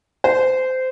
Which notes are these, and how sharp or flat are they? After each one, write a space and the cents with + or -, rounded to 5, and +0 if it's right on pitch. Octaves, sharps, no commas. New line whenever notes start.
C5 -20